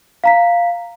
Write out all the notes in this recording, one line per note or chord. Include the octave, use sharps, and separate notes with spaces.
F5 A#5 B6